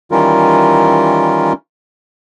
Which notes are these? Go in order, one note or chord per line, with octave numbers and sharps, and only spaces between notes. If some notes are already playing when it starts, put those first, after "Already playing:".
D#3 E3 G3 C#4 F4 A#4